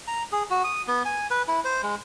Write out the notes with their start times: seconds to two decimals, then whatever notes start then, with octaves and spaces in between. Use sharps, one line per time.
0.07 A#5
0.32 G#4
0.50 F#4
0.64 D#6
0.88 B3
1.05 G#5
1.30 B4
1.48 E4
1.65 C5
1.83 G#3